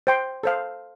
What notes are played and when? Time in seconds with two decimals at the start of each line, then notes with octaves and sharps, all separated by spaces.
0.07 C5 G5 C6
0.43 A4 C5 F5